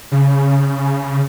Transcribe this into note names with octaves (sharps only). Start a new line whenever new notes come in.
C#3